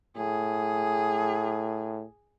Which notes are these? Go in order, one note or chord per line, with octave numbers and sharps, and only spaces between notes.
A2 G#4